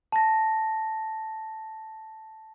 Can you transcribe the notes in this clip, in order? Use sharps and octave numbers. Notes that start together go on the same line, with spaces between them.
A5 A#6